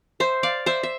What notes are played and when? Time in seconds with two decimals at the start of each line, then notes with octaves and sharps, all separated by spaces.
0.20 C5 E5
0.43 D5 F5
0.66 C5 E5
0.83 E5